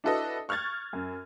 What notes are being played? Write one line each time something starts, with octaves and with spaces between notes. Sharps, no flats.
D4 E4 F#4 A4 B4 D#5
C#6 F6 F#6 G#6 A6
F#2